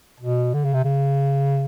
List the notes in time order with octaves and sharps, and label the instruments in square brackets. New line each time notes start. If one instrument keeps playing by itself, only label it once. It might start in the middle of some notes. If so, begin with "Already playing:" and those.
[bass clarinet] B2
D3
C#3
C3
C#3